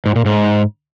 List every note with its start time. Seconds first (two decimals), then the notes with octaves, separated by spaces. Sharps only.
0.06 G#2
0.16 A#2
0.26 G#2